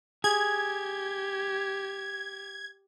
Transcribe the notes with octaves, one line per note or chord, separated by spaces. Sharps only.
G4 G#4 G#6